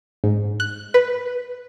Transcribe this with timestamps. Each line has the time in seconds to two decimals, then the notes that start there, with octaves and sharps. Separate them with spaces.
0.24 G#2
0.60 F#6
0.94 B4